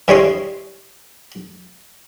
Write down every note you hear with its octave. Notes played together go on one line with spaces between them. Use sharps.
G2 E3 G3 C#5 D#5 C6